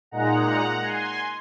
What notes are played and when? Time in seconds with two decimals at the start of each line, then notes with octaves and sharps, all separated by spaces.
0.11 A#2 G#3 D#4 F#5 A#5
0.82 G#5 C6